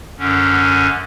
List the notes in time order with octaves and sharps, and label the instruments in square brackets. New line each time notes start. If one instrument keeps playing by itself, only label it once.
[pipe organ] F#2 D3 C#4